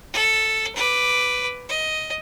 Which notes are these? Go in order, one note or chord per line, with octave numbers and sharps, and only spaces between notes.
A4
B4 D6
D#5